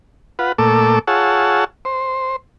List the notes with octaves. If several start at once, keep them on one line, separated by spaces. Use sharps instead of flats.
F4 B4 F#5
A#2 A3 A4 D6 E6
F4 G#4 C#5 F#5 A5 E6
C5